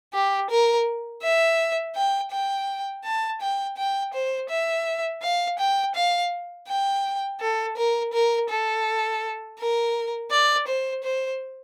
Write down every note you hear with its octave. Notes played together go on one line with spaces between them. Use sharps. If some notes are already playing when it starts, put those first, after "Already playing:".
G4
A#4
E5
G5
G5
A5
G5
G5
C5
E5
F5
G5
F5
G5
A4
A#4
A#4
A4
A#4
D5
C5
C5